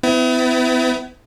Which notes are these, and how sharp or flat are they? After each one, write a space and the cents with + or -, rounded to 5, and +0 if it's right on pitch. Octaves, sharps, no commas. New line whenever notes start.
B3 +45 E4 +0